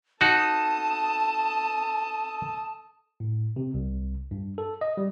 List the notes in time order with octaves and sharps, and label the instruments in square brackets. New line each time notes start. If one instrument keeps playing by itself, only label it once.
[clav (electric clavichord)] D#4 F#4 [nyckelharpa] A4 D#6 [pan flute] A5
[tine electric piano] A2
C3
C2
G2
A4
D#5
G3